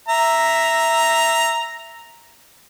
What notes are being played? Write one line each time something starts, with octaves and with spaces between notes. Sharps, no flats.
E5 A#5